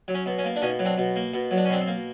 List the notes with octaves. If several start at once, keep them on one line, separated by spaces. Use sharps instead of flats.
F#3
C#4
B2
C#4
A#3
D4
B2 C#4 D#4
F#3
C4 D4
B2
A#3
B2
F#3
D4
C#4
B2 C4 D4
C4
A#3